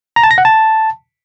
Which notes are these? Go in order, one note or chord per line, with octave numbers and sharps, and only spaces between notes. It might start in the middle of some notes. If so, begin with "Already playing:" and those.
A#5
A5
A#6
F#5
A5